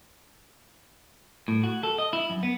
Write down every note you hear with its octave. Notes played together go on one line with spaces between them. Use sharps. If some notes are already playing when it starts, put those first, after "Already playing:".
A2
F#4
A4
D#5
E4
F#2
B3